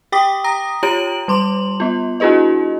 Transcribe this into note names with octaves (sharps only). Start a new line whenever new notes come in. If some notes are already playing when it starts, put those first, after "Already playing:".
G4 G5 D6 D#6 B6
A#5 D#6 A#6
F4 G4 C#5 A#5 D7 F#7
G3 C6 D6 F#7
B3 F4
D4 E4 F#4 G#4 B4 D#5